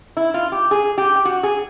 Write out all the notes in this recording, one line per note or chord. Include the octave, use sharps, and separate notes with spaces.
E4
F4
G4
G#4
G4
G4
F#4
G#4